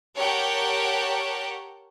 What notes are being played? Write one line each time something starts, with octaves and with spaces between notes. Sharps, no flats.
G4 A#4 C#5 F#5 G5 A5